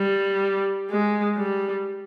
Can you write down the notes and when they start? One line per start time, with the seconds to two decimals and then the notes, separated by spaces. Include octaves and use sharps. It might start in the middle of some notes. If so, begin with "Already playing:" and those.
Already playing: G3
0.90 G#3
1.37 G3